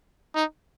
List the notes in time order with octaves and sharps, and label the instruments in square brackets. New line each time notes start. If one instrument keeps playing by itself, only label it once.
[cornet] D#4